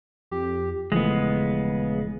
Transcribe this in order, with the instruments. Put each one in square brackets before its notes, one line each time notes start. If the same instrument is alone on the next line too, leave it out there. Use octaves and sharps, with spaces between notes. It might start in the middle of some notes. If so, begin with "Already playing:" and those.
[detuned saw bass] F2 [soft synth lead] G4
[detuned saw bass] D#1 [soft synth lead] C#3 [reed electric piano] E3 F3 A3 [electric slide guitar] G#3 B3